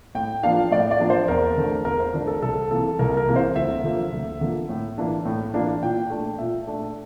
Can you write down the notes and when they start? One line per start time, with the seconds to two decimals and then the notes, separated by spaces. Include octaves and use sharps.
0.15 A2 G5
0.43 F3 A#3 D4 F5
0.71 A2 D5
0.91 D5
0.99 F3 A#3 D4
1.10 C5
1.28 E2 A#4
1.57 D3 A3 D4
1.85 E2 A#4
2.00 C5
2.14 D3 A3 D4 A#4
2.27 A4
2.42 C2 A4
2.71 C3 E3 A#3 A4
2.99 C2 A#4
3.17 A#4
3.27 C3 E3 A#3
3.36 C5
3.56 D2 E5
3.84 D3 F3 A#3
4.12 D2
4.41 D3 F3 A#3
4.69 A2
4.98 E3 A#3 D4
5.25 A2
5.54 E3 A#3 D4
5.82 A#2 G5
6.10 A3 D4
6.38 A#2 E5
6.67 A3 D4